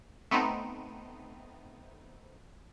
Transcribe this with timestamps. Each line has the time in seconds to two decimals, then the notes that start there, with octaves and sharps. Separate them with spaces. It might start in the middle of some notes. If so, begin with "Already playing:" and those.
0.31 A3 B3 C4 D#4